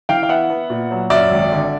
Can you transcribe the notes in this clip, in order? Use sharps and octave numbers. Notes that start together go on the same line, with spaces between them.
E3 F5 G5
F5
B3 E5 F#5
B3
A#2
F#3
F#2 D5 E5
G#1
D3